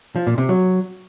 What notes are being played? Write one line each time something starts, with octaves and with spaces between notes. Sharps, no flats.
F3
A#2
C3
F#3